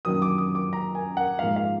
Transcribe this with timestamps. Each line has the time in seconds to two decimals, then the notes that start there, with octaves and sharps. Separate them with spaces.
0.05 F#2 D#3 F#3 A#3 D4 D#6
0.22 D6
0.38 D#6
0.55 D6
0.73 A#5
0.95 G#5
1.17 F#5
1.39 G#2 F3 A#3 F4 F5
1.56 F5